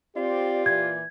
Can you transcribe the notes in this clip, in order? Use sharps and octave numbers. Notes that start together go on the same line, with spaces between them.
C4 F4 G4 D5
A#2 E3 D5 G#6